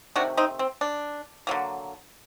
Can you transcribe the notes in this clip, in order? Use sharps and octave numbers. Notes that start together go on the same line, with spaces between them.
C3 D#3 A3 D4 F#4
C4 D#4
C4
D4
D3 F#3 A#3